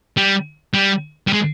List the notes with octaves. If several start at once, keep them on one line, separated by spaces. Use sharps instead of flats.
G3
G3
G3
G#3